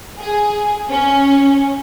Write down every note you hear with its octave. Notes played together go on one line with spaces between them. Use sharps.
G#4
C#4